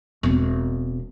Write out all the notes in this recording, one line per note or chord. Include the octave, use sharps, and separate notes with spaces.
E1 C4